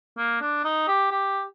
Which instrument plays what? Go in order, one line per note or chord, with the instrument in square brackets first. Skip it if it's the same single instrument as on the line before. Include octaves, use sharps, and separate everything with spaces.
[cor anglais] A#3
D4
D#4
G4
G4